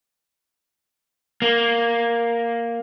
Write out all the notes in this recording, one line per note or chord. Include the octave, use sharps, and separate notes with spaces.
A#3